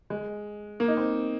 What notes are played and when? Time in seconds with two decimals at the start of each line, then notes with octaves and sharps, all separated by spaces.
0.10 G#3
0.80 A#3
0.88 D#4
0.97 C4